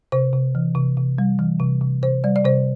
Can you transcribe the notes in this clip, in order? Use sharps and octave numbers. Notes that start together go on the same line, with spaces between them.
C3 C5
C3
E3
C3
C3
G3
E3
C3
C3
C3 C5
G3 D5
D5
C3 C5